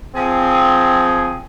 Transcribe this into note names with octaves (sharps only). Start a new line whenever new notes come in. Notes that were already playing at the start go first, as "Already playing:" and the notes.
F3 C4 G#4